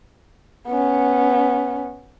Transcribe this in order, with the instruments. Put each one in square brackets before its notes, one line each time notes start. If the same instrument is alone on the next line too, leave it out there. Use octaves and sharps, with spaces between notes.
[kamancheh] B3 C#4